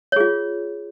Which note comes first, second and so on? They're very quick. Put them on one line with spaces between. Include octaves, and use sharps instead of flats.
C#5 G#4 F4